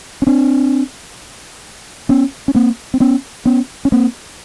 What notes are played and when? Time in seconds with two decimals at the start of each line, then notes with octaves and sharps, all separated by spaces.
0.22 C#4
0.27 C4 D4
2.09 B3 C#4
2.48 C#4
2.55 A#3 C4
2.94 C4
3.00 B3 C#4
3.45 B3 C#4
3.85 C#4
3.92 A#3 C4